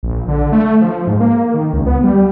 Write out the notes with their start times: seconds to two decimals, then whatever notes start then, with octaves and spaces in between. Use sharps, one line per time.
0.03 A#1
0.28 D3
0.52 A3
0.81 F3
1.07 G#2
1.20 A#3
1.54 D#3
1.73 C#2
1.86 B3
2.04 G3